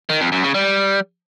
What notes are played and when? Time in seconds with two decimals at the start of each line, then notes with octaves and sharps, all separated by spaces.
0.10 D#3
0.21 F2
0.32 F#2
0.43 C#3
0.55 G3